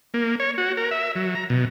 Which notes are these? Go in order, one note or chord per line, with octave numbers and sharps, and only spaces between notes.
A#3
C#5
F#4
A#4
E5
F#3
A#5
B2